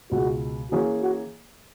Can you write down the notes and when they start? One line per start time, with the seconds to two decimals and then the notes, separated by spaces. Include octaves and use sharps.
0.11 C#2 B2 G#3 F#4
0.72 E3 A#3 C#4 F#4 G#4 C#5
1.03 F#4